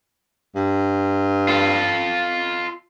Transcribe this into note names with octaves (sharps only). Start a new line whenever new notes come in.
G2
F4 A4